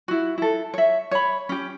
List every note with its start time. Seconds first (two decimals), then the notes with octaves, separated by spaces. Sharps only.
0.08 E4 F#4
0.38 E4 A4
0.74 C#5 E5
1.11 C#5 B5
1.49 C#4 G4